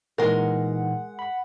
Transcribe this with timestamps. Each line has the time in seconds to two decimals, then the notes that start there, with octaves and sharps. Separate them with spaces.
0.18 A#2 E3 G#3 D#4 A#4 F#5
1.19 B5